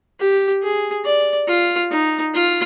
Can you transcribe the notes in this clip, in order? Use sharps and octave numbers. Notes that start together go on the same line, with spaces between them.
G4
G#4
D5
F4
D#4
F4